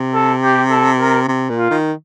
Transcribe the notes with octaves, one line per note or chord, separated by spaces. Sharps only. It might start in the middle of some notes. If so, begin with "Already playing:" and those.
Already playing: C3
A4
G4
A4
A#4
C3
A#2
F4
D#3